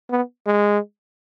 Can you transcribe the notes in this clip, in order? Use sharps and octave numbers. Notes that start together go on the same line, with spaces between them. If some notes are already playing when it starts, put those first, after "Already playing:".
B3
G#3